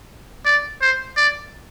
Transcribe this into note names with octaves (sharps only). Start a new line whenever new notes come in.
D5
C5
D5